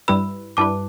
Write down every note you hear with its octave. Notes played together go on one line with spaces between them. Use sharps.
G2 G3 E4 B4 B5 E6
G2 G3 E4 B4 A5 D6